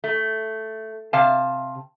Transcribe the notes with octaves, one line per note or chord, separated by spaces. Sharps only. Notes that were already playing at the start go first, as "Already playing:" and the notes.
A3
C3 F5 A5